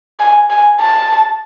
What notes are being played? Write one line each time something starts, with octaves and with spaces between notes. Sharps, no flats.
G#5
G#5
A5